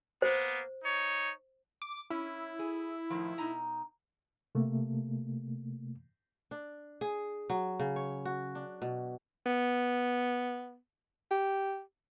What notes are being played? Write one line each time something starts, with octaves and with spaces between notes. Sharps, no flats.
A#3 B3 C5
D#4 C#5
D6
C#4 E4
G#4
A2 D#3 F3
B2 D#4 A#5
C3 A3 A#3
D4
G#4
F#3
C#3
C#5
F#4
D4
B2
B3
G4